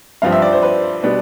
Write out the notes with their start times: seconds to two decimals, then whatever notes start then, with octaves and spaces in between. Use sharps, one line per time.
0.22 G2 F3 C4 F5
0.32 E5
0.42 D5
0.53 C5
0.63 B4
1.03 B2 G3 B3 D4